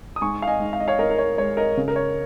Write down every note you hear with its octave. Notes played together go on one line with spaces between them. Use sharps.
D#6
G#2 G#5 C#6
F5
D#5 G#5
G#2
F5
D#5
C#5 F5
G#2 A#4 D#5
A#4
C#5
G#3 C#5
A#4 D#5
C#3
A#4
C#5